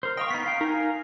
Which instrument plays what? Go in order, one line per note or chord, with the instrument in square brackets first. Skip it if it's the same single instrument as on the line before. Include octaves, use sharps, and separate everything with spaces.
[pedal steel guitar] A#4 C5
[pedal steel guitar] D#5 F5 C#6 [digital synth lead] G5
[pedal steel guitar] B3 D#4 [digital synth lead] B6
[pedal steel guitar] F5 G5
[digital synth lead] D#4 [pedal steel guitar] A#4 F5 G#5